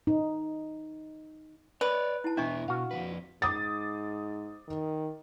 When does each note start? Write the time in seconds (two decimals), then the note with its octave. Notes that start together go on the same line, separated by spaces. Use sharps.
0.07 D#4
1.81 B4 C#5 D5 E6
2.24 E4 A5
2.37 E2 B2 D4 E4 D#5 C#6
2.68 B2 F#4 F5
2.91 F2 C#3 B4
3.42 G#2 D6 D#6 A6
4.68 D#3